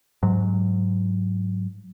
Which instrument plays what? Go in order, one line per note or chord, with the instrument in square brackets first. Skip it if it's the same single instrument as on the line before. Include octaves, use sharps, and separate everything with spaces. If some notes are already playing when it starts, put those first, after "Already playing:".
[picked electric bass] G#2 F#3